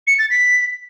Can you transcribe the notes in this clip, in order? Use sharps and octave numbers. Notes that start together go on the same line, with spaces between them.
C#7
A6
B6